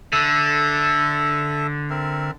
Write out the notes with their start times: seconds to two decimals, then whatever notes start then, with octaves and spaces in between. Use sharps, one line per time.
0.12 D3 A4 E5
1.90 C4 A#4 E5